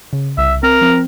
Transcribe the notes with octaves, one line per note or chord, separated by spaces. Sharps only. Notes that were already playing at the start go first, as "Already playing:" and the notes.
C#3
C2 E5
C4 A#4
F3 C4